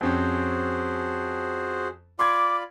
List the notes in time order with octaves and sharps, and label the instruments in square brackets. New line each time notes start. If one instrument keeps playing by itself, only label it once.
[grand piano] F2 C4 C#4 [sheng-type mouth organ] F#4 G#4 C5
[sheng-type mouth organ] F4 D5 B5 [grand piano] C6 G#6 [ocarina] D6